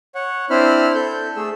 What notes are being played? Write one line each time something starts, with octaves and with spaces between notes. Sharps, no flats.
C#5 F#5
C4 D4 E4 C5 B5 F6
A4 G6
A3 G#4 E6